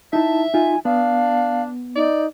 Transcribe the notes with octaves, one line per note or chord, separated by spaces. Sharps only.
D#4 E4 E5 A5
D#4 F4 G#5
B3 D4 F5
D#4 D5